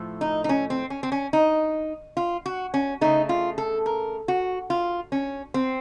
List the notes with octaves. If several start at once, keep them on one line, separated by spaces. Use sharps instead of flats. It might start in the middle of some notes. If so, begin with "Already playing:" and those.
Already playing: A2 F3 A3
D#4
D#4
C#4
C4
C#4
C4
C#4
D#4
F4
F#4
C#4
C#3 A3 D#4
F4
A4
A#4
F#4
F4
C#4
C4